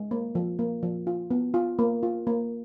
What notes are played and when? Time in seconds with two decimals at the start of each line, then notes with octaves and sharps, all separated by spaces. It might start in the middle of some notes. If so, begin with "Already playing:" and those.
Already playing: G#3
0.11 A#3
0.35 F3
0.59 A#3
0.83 F3
1.07 F4
1.31 B3
1.54 F4
1.79 A#3
2.03 F4
2.27 A#3